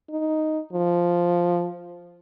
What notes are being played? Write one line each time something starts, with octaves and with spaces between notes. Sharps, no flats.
D#4
F3